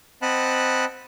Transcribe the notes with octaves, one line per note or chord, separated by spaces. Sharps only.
C4 D#5 F#5 A5 B5 F#6